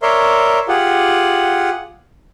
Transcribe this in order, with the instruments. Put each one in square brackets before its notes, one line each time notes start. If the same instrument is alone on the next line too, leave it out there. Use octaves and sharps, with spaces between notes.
[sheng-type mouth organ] A#4 C#5 D5 E5 C6
F4 G4 G#4 F#5